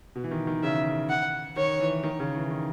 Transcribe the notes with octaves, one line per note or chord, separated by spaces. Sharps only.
B2
E3
D#3
D#3
C#3 E5
F#5
D#3 C#5
E3
D#3
C#3
E3
D#3